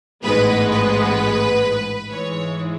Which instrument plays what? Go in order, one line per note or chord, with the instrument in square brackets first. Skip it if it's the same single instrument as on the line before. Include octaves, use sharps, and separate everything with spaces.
[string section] A1 G#2 G#3 B3 B4
B4
G#2 E3 G#3 C#5